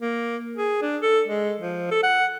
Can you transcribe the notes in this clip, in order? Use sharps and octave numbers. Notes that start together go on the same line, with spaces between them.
A#3
G#4
D4
A4
G#3
F3
A4
F#5